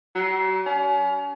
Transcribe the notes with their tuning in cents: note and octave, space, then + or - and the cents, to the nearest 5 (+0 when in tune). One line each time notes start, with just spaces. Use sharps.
F#3 +45
C#4 +35